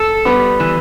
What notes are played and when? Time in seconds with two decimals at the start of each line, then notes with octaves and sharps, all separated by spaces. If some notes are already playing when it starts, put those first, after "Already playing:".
Already playing: A4
0.25 G3 B3
0.60 E3